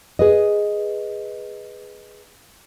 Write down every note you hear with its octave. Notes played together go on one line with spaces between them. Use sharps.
G#4 B4 D#5